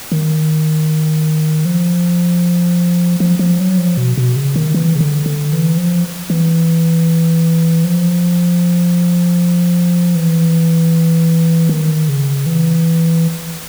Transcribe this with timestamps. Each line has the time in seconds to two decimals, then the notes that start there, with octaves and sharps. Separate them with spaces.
0.12 D#3
1.65 F3
3.20 F3
3.39 F3
3.60 F#3
3.78 F3
3.97 B2
4.17 B2
4.36 C#3
4.56 D#3
4.74 E3
4.95 C#3
5.00 D3
5.26 D3
5.53 E3
5.77 F3
6.30 E3
7.84 F3
10.15 E3
11.69 D#3
12.09 C#3
12.46 E3